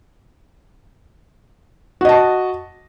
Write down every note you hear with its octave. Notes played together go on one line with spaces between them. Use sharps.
F#4 D#5 A5